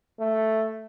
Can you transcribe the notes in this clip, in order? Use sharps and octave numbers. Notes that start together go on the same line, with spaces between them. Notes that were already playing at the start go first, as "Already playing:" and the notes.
A3